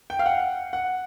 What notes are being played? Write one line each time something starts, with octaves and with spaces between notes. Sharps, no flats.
G5
F5
F#5
F#5